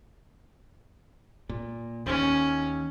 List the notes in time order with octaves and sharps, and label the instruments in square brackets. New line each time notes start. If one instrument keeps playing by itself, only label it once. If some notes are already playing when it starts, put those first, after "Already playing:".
[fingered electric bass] A#2
[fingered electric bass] D#2 [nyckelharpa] C#4